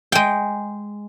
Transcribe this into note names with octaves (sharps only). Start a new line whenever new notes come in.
G#3 G5